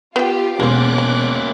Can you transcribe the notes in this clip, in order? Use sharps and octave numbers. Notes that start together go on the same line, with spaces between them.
B3 F4 G4 G5
E1 G#3 A#3 C4 C#4 D6 F#6
G#3